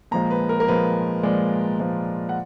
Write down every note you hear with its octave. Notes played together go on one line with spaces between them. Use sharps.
A#2 F3 G#3 A#5
B4
A#4
A#4
A#2 F3 G#3 B4
A#2 F3 G#3 D5
A#2 F3 G#3
F#5